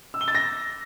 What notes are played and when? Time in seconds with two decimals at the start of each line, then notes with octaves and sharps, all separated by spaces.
0.14 E6
0.21 G7
0.28 A6
0.35 A#6